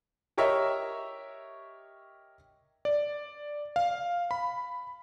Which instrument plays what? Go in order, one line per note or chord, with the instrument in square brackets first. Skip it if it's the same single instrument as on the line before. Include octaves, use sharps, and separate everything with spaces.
[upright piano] G4 A#4 C#5 D#5 E5 C#6
[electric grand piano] D5
F5
B5